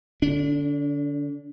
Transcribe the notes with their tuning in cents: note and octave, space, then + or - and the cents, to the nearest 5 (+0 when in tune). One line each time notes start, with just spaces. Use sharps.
D3 +0 D4 -35